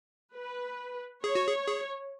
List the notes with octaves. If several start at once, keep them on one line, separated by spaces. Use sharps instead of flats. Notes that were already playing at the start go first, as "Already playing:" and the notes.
B4
G#4 C#5
F#4
G#4
G#4